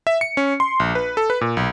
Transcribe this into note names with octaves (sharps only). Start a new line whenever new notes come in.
E5
C#7
C#4
C6
A#1
B4
A4
B4
A#2
B1